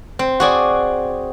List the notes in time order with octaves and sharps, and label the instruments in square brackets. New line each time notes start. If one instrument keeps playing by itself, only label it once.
[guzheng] C4
F#4 G#4 D5